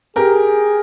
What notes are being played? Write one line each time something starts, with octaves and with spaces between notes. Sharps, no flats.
G4 G#4 A#4